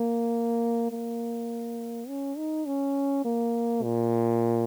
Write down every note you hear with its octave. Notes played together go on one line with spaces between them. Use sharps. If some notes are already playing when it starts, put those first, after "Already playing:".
Already playing: A#3
A#3
C#4
D#4
C#4
A#3
A#2